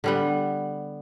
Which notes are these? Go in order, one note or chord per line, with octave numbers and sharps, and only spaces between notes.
D3 G3 B3